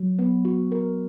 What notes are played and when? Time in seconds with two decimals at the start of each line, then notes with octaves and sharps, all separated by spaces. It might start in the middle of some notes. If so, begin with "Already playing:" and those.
Already playing: F#3
0.19 B3
0.45 F#4
0.72 A#4